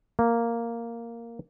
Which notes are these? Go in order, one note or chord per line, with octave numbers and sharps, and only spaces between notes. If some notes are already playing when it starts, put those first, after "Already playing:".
A#3